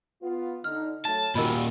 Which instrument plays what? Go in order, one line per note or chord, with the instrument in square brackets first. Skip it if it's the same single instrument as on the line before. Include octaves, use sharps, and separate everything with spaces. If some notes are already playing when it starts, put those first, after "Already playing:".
[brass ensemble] B3 F4
[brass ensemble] D3 D#4 [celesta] F6
[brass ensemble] F#3 A3 [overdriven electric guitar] A5
[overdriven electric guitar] A#2 D#3 [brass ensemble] G3 F4 F#4 [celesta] A#4 D#5 B5